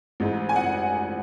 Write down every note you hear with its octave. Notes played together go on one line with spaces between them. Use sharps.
A1 G#2 G#3
G#5
F#5